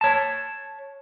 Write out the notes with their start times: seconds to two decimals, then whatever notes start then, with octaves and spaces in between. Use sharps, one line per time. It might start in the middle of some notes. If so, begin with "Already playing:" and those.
0.01 C#5 A5